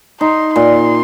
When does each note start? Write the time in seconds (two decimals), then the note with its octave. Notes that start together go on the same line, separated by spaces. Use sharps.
0.21 D#4 C6
0.55 A#2 C6